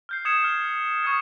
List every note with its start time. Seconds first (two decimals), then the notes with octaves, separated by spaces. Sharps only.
0.09 F6 G6 C7
0.25 D#6 G#6 C#7 E7
0.44 F6
1.03 C#6 D#6 F6 G#6 C#7